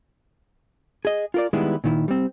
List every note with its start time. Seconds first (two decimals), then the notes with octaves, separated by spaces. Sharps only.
1.05 G#4 D#5
1.34 F4 A#4 D5
1.53 D#3 G3 G#3 B3 E4
1.84 A#2 D#3 E4
2.08 G3 C4